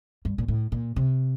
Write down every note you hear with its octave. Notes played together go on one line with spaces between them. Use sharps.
G2
A#2
A2
A#2
C3